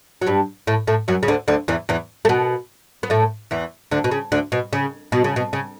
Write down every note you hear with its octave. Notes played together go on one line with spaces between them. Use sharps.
F#3
G2 G3
A2 A3
A2 A3
F#2 F#3
C#3
D2 D3
D2 D3
E2 E3
E2 E3
A3
B2 B3
B3
A2 A3
E2 E3
D2 D3
B2
C#3
D2 D3
B2
C#3
B2
C#3
B2
C#3